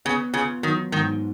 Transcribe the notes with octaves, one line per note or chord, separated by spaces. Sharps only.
C#3 B3
C#3 F4
D#3 F#3
G#2 D#3